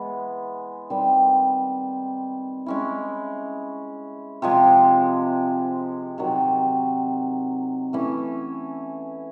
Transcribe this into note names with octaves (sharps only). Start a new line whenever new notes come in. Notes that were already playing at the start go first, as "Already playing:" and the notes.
Already playing: E3 G#3 B3
D#3 G3 C4
G#3 C#4 E4
C3 F3 G#3
C3 D#3 F#3
E3 A3 C#4